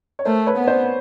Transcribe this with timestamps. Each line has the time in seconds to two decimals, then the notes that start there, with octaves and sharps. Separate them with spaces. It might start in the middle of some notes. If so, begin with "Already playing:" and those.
0.19 C#5
0.25 A3 A#4 C5
0.46 B4 C#5
0.58 B3
0.68 C5 D5